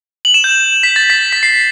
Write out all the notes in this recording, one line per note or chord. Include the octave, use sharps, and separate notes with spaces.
F#7
E7
G6
B6
A6
B6
B6
C7